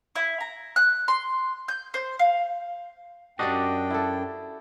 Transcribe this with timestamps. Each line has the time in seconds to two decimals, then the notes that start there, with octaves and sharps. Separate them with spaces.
0.16 E4
0.41 A#5
0.76 F#6
1.08 C6
1.68 G6
1.94 C5
2.19 F5
3.39 F#2 D4 F#4 G4 D5 D#5 G5
3.90 E4 A4